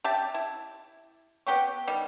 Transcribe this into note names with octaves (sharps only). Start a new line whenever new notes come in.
G4 E5 A5
E4
B3 G4 G5 C#6
D#3 G3